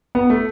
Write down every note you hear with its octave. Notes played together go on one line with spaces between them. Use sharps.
B3
A3